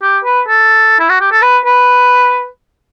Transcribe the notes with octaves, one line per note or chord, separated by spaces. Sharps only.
G4
B4
A4
E4
F#4
G4
A4
B4
B4